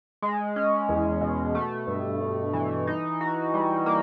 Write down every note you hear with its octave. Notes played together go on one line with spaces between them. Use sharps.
G#3
C#4
E2
B2
A3
G2
G2
E3
D#4
F#4
G3
A#3